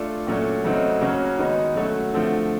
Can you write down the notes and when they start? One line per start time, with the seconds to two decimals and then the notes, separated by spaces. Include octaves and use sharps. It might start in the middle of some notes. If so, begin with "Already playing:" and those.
Already playing: A3 D4 F4 A4
0.27 A#2 F#3 A3 C#4
0.64 C#3 F#3 A3 C4 D#4
1.01 C#3 F#3 A#3 C#4 F#4
1.38 D#3 G#3 B3 D#4 F#4
1.75 F#3 A3 C#4 F#4 A4
2.13 D3 F3 A3 C4